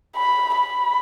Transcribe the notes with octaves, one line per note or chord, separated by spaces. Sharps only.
B5
B5